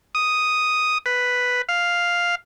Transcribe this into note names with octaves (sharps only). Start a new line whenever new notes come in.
D#6
B4
F5